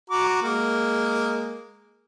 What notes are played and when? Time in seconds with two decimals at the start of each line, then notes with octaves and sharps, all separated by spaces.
0.10 F#4 A#5 D6
0.42 G#3 A#3